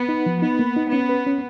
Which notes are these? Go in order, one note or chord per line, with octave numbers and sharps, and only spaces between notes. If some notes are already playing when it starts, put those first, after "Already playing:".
Already playing: B3
D#4
F3
B3 D#4
A#3
D#4
B3 C#4
B4
C#4